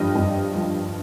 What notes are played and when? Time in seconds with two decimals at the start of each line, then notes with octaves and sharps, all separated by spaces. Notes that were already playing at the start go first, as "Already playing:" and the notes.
Already playing: G2 F3 G4 D#5 G5
0.15 G2
0.54 F3